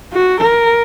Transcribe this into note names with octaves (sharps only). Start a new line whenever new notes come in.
F#4
A#4